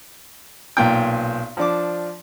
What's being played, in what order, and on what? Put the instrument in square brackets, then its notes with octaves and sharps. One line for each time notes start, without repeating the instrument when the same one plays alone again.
[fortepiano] B1 A#2 G5
F3 D4 D6